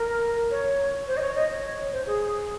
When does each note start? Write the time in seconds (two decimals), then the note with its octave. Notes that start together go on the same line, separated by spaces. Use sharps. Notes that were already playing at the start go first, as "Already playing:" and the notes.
Already playing: A#4
0.51 C#5
1.08 C5
1.17 D#5
1.21 C#5
1.36 D#5
1.50 C#5
1.92 C5
2.06 G#4